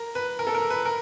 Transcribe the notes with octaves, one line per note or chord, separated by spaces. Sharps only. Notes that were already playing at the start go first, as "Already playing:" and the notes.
Already playing: A#4
B4
A#4
A4
A#4
B4
A#4